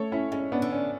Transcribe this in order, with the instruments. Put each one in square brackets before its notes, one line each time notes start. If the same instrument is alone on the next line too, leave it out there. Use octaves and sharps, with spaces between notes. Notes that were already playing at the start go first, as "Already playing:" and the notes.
Already playing: [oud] A3 [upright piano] A4 C#5
[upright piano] C#4 E4
[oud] G#3 [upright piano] C#4
[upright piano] B3 D4
[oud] D3
[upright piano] C#4